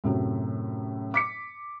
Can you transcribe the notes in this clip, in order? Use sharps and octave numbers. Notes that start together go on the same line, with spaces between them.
F#2 A2 C3 F#3
D6 B6 C#7